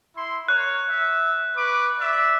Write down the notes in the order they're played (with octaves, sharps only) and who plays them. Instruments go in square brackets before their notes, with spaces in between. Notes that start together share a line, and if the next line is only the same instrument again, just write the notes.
[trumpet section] E4 C6
[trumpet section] A#4 C#5 [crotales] F#6
[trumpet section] E5
B4 C#6 D6
D5 E5